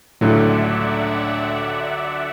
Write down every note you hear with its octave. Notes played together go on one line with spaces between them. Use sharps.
C#2 A2 D3 F#3 A3 D5 E5 F#5